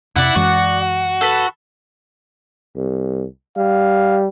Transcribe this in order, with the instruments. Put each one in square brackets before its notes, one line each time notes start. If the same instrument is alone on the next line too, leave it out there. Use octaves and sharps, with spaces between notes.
[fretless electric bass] F2 C3 [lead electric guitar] E4 [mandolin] D5 F#5
[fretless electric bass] F#2 E3 G#3 [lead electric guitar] F#4
[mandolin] A4 B4
[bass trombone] C2
[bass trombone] G3 [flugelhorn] F5